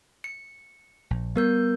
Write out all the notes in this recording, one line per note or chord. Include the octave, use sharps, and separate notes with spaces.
C#7
A#1
G3 B3 A#4 G6